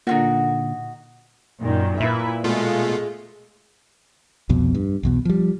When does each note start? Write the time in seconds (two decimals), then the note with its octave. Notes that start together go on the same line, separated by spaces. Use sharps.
0.07 A#2 D3 D#4 F4 F#4
1.62 F#2 A#2 D#3
2.00 A#2 E4 B4 E5
2.44 B2 G#3 A3 F4
4.49 C2 F2 B2
4.75 G2
5.03 B1 E2 B2
5.25 F3 G3